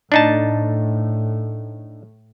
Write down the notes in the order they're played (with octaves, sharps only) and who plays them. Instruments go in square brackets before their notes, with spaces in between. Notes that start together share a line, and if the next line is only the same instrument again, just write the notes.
[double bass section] A2 [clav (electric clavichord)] D4 D#4 A5